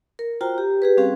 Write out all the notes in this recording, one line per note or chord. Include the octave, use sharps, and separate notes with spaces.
A#4
F4 F#4 C5 G5 A#5
G4
G4 G#4 B4
G3 C4 C#4 F#4 G#4 F5